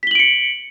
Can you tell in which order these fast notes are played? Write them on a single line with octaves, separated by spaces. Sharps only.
B6 G7 F#7 D7 C#7